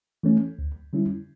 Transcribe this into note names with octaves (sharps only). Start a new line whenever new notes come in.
E3 A3 C#4
D2
D3 G3 C#4 E4